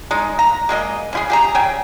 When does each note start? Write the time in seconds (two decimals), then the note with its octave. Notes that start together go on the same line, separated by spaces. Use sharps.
0.11 G#3 D#4
0.39 A#5
0.69 G#3 A#3 G#4 D#5
1.13 C#4 E4 G#4
1.30 G4 G#4 A#5
1.55 C#3 G5 G#5